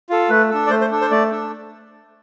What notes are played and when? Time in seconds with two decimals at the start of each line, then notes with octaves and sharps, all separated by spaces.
0.10 F4 A4
0.30 A3 B4
0.50 D4 A4
0.67 D5
0.70 A3 C5
0.81 C5
0.91 D4 A4
1.01 C5
1.11 A3 D5
1.31 D4 A4